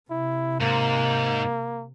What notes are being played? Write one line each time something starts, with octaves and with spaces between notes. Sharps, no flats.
C3 E4
G#2 A#3